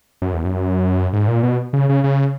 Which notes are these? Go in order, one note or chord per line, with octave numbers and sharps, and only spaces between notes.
F#2
E2
F#2
G#2
A#2
B2
C#3
C#3
C#3